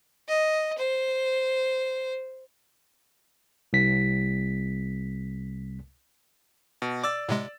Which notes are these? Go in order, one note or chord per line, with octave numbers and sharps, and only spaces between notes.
D#5
C5
C2 B6
B2
D5 D6 E6 A6
A2 C3 G#3